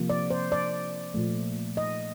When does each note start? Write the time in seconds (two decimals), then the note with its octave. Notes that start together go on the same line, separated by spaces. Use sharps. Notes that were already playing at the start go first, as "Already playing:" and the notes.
Already playing: C3 F3 A#3
0.10 D5
0.30 C5
0.52 D5
1.14 A#2 F3 A3
1.77 D#5